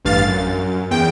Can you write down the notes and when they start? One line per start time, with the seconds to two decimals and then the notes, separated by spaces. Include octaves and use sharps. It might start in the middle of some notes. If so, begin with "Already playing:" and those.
0.05 A1 G2 F5 A6
0.28 F#2
0.91 E2 G5